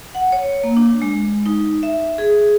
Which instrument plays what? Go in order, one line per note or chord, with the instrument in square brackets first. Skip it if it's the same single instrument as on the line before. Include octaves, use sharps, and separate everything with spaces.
[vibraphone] F#5
C#5
A#3
D4
G#3
D#4
E5
G#4